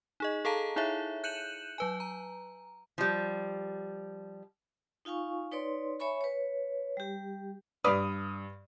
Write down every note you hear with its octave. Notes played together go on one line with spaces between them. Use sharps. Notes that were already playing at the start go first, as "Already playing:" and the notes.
D#4 G#4 D#5
G#4 A4 F5 A5 A#5
D#4 E4 G#4 C#5 E5
F#6 G6 C#7 D#7 E7 F#7
F#3 B4 G#5
A#5
F3 G3
D#4 F4 F5 G#5 C#6
D#4 B4 C#5 D5 C6
C#5 E5 G#5 B5 C#6
B4 C#5
G3 G4
G2 B4 D5 F5 D#6